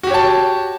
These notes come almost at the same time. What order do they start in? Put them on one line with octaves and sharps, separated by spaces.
F#4 G4 C#5 A5